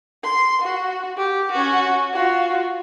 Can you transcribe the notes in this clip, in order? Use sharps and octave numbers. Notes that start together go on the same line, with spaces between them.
C6
F#4
G4
C#4 F#4
F4 F#4